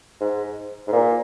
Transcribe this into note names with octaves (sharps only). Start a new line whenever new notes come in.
G#2
G#2
A#2